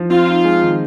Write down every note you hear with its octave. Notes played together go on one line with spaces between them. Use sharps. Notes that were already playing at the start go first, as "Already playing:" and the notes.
Already playing: F3
C4 F4
D#4
G#3
D#3